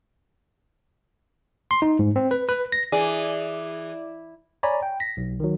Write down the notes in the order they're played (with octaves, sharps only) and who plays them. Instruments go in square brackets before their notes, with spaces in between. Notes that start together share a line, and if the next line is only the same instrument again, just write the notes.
[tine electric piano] C6
D#4
G#2
C4
B4
B4
A#6
[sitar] E3 [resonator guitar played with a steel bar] G#4 [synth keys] D5
[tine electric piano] C#5 D5 G#5 A#5 B5
G5
A#6 B6
B1
D#3 F#3